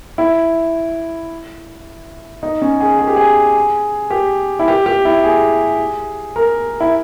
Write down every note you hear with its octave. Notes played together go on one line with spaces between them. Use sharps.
E4
D#4
C#4
G#4
G#4
G4
G#4
G4
E4
G4
G4
E4
G#4
A#4
E4